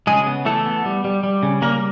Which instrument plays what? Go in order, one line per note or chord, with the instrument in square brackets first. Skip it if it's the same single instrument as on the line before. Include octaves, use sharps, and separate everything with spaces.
[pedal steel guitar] C#3 G#3 G#4
B3
E3 A3 A4
B3
G3
G3
G3
C#3
G3 A#3 A#4